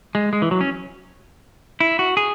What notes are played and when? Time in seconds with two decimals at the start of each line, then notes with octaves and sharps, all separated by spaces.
0.15 G#3
0.33 G#3
0.42 E3
0.51 F#3
0.61 C#4
1.80 E4
1.99 F#4
2.17 G#4